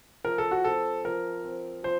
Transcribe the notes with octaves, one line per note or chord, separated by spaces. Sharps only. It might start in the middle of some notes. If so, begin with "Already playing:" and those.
F3 A#4
A4
F#4
C4 A4
F3 A#4
C4
F3 C5